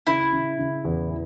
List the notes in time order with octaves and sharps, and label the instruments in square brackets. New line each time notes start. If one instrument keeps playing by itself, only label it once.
[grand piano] C#3 [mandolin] E4
[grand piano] C#3
C#3
E2
E3